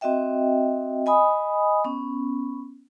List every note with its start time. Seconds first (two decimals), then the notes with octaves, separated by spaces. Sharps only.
0.01 C4 F#4 D#5 E5 G5
1.06 D#5 G#5 B5 D#6
1.85 B3 C#4